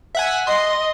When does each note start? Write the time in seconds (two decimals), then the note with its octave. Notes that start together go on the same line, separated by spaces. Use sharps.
0.15 E5 F#5 G#5
0.47 D#5 C6